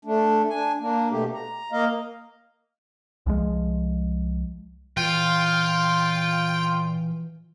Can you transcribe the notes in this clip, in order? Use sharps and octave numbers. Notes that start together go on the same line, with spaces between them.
A3 D4
D4 G#5
A#3 D4
B2 A3 G4
A#5
A#3 D#5 F5
C2 F3 G#3
A#2 E3 F4 G5